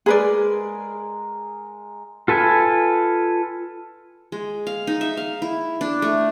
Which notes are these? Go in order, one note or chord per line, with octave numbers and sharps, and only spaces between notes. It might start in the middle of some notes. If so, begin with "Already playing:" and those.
G#3 G#4 A#4 B4 D5
F4 A4 B4 G#5
G#3
F5
D#4
E5
F5
E4
D4
A3